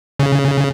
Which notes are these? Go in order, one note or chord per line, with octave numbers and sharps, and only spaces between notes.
C#3